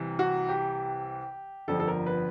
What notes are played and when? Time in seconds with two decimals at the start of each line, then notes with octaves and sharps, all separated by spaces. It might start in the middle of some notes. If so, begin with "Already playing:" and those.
Already playing: C2 C3 E3
0.19 F#4
0.49 G4
1.68 G1 F2 D3 F3 A4
1.80 A4
1.88 A#4
2.06 B4